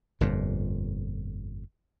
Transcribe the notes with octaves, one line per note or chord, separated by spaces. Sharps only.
G1 F2 A#2